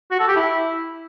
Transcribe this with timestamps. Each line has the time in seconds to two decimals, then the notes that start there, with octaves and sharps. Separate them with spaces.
0.11 F#4
0.20 A4
0.28 G4
0.36 E4